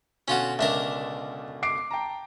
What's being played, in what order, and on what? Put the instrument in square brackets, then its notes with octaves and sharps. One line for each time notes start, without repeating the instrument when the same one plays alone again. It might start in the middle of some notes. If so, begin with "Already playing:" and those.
[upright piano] B2 D3 [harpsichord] C#4 F4 F#4
[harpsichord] C#2 D4 A#4 [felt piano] E5
[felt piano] D6 C7 D7
[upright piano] G5 A5 A#5